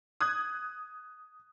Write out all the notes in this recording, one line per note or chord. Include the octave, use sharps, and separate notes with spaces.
D#6 F#6 G#6